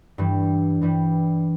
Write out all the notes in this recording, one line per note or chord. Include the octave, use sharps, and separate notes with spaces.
G2 E3 G3
G2 E3 G3